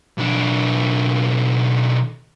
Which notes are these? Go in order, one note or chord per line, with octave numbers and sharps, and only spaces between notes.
B1 D4